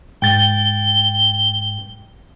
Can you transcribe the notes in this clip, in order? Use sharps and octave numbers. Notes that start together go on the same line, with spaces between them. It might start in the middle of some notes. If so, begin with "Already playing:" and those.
G#2 G5 A6 G7